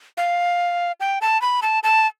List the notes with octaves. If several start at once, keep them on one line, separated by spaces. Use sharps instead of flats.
F5
G5
A5
B5
A5
A5